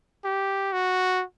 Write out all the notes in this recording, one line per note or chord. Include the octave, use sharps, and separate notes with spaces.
G4
F#4